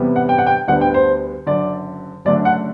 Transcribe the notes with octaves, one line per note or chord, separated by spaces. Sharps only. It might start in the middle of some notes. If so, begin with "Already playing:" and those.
Already playing: E2 C3 G3 B3
F#5
G5
F#5
G5
D2 D3 G3 B3 D4 F#5
G5
C5
F#1 F#2 D3 D5
F#1 F#2 D3 A3 D4 D5
F#5